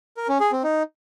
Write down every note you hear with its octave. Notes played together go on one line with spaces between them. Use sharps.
A#4
C#4
G#4
C4
D#4